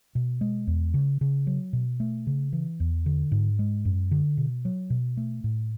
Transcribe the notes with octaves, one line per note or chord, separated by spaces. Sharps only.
B2
G#3
E2
C#3
C#3
F#3
B2
A3
C#3
E3
E2
D3
G#2
G#3
F#2
D3
B2
F#3
B2
A3
A2